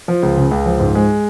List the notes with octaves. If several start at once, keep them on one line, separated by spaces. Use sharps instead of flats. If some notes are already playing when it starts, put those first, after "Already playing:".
F3
C#2
C#3
C#2
F3
G#2
G#3